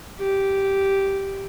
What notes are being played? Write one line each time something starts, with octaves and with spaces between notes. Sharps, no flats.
G4